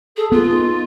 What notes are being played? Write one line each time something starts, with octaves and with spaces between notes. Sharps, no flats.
G#4 A4
B3 F4 G#4
D#4
D#4